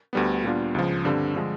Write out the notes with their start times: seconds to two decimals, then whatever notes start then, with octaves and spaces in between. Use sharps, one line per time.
0.13 D2 D3 G3 B3
0.44 A#2 G3 B3 D4 F4
0.75 C#2 C#3 F3
1.05 G2 D3 G3 C4
1.35 D3 F3 G#3